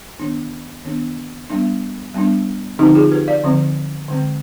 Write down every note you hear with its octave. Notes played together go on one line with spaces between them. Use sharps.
D#3 B3 D4
D#3 B3 D4
G3 B3 D4
G3 B3 D4
D3 F3 C4 D#4 G4
F4 G#4
G4 B4
D5 F5
D3 F3 C4
D3 G#3 C4